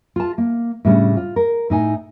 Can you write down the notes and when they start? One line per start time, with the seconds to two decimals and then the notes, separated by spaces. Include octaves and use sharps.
0.16 F4 A5
0.38 A#3
0.85 A2 C#3 G3 C#4 D4
1.17 F4
1.36 A#4
1.70 A2 D#4 G#5